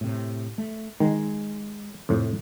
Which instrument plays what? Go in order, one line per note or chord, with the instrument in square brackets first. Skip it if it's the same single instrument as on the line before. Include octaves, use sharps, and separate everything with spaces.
[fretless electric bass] A2 C3
A3
[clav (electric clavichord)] D#3 [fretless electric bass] G#3
[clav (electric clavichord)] F2 A2 [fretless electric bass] C3